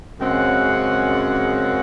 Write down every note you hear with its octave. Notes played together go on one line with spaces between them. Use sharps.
F#2 C#3 G#3 C4 F#5